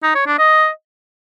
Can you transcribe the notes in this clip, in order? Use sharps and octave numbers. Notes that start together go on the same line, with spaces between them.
D#4
C#5
D4
D#5